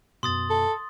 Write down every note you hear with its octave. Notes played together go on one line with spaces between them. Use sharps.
F#2 B2 C6 D#6 A6
A4